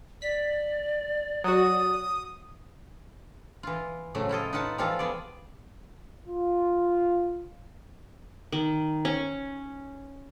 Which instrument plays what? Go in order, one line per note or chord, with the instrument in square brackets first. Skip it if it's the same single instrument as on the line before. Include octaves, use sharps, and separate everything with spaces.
[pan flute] D5 [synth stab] B6
[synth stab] F#3 F#4 [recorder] D#6
[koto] E3 F4
A2 C#3 F3 F#3 A3
E4 F4 A4 D#5
D#4 F4 B4 F#5 A5
E3 F3 G3 F4 A4 F5
B3 G#4 D5
[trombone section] F4
[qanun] D#3
C#4